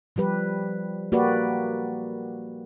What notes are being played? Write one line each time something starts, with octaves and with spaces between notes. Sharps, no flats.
F3 G3 G4 B4
A#3 F#4 G4 B4 D5